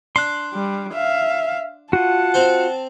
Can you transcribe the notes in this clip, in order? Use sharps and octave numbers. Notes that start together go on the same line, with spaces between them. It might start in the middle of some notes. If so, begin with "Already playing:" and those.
D4 C6 F#6
G3
E5 F5
F4 F#4 F#5 A5
C4 C5